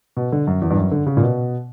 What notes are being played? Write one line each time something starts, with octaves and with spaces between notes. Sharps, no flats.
B2
D3
F#2
E2
G2
F#2
D3
C#3
A#2
B2